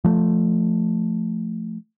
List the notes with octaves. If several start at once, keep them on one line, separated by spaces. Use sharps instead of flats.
F3 A3